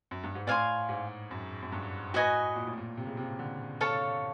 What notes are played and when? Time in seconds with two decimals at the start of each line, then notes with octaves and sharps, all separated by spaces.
0.11 F#2
0.23 G2
0.35 G#2
0.47 A2 D5 F5 G#5 C6
0.89 G#2
1.31 F#2
1.62 F#2
1.72 G2
2.14 A2 F#4 B4 D#5 G#5
2.56 A#2
2.67 A2
2.78 A#2
2.97 C3
3.07 C#3
3.17 C3
3.39 D3
3.81 A4 C#5 F5 A5